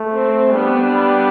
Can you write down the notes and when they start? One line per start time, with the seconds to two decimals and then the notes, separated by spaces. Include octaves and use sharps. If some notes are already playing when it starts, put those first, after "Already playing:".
Already playing: A3
0.12 C4
0.53 G3 B3 D4
0.93 G3